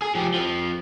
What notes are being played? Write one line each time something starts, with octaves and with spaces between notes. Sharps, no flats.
G#4
F3 G4
F3 C4